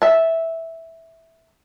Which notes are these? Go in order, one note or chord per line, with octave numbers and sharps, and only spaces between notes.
E5 A5